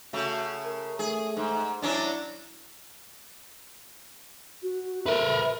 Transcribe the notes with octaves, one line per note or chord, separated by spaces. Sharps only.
C#3 A3 F#4
A#4
A3 G#4
G#2
F#3 C#4 D4 E4
F#4
A#4 B4 E5